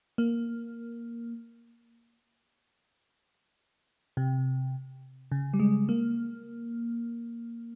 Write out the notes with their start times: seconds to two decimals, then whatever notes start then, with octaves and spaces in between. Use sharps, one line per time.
0.18 A#3
4.17 C3
5.32 C#3
5.54 G3
5.59 G#3
5.89 A#3